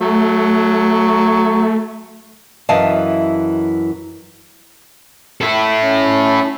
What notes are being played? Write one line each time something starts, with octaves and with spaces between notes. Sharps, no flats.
F#3 A3
F#2 E3 E4 D#5 F5 A5
E4 A4
C#4